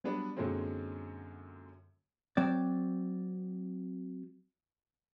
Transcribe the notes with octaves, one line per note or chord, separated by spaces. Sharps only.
F#3 G3 B3 D4 B4
F#2 A#2 D3 F#3 G#3 C4
F#3 C4 D5